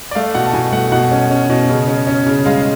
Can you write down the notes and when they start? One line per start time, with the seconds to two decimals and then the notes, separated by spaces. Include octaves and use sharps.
0.11 D5
0.15 A3 F5
0.34 B2 F#5
0.45 A5
0.53 B2 G#5
0.72 A3 F#5
0.92 B2 F#5
1.12 C#4
1.30 C#4
1.50 B2
1.69 C#3
1.88 C#4
2.07 C#4
2.26 C#3
2.46 G#3 F5